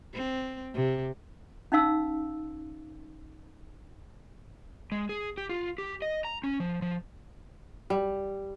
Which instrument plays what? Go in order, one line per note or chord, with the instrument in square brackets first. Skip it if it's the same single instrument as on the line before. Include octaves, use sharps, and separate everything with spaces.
[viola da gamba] C4
C3
[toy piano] C#4 D#4 F5 E6
[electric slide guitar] G#3
G#4
G4
F4
G4
D#5
A#5
C#4
F3
F3
[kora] G3